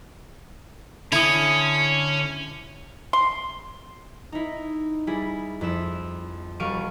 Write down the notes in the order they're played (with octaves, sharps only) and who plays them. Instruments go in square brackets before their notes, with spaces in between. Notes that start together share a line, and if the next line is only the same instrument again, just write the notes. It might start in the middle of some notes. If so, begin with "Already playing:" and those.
[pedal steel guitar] D3 D#6 [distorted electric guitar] C#4 [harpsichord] E4
[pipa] C6
[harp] D#4 E4
G3 E4 G#4
F2 E4 E6
E1 G3 F5 C#6 D7 D#7